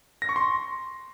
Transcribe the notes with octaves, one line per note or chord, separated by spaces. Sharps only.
A#6
C#6
C6